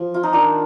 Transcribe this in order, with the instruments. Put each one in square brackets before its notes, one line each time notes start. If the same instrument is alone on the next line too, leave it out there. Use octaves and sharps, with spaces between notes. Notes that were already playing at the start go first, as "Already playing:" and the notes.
Already playing: [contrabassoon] F3
[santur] F4
D#4
[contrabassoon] D#3 [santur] D4